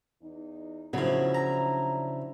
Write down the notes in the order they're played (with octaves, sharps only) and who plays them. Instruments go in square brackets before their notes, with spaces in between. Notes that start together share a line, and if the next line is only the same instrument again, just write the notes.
[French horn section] E2 D#4
[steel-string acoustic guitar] C#3 E4 [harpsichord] F3 F#3 [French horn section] D4
[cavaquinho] A#5